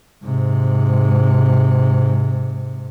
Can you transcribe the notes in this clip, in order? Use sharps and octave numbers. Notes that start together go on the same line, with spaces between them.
G#2 C3